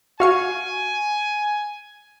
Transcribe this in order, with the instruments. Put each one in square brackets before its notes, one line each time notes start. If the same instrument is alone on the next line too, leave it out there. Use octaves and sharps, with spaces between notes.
[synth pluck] F#4 F5 C#6 [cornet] G#5